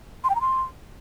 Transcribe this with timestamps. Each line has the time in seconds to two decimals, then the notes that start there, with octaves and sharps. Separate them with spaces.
0.24 C6
0.30 G5
0.35 A#5
0.41 C6